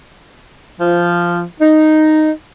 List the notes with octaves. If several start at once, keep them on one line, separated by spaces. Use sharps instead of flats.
F3
D#4